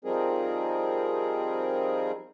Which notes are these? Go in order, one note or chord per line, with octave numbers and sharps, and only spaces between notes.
F3 G3 C4 D#4 G#4 A#4